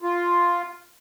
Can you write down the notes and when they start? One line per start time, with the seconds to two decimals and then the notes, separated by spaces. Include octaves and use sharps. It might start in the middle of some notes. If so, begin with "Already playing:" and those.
0.02 F4